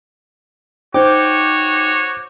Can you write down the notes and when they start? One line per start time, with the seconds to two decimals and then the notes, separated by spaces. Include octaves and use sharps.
0.94 D#4 F#4 C5 C#5 G5 D6 G6